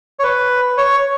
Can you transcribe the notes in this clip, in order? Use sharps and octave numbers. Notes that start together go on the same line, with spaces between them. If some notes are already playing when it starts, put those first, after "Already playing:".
C#5
B4
C#5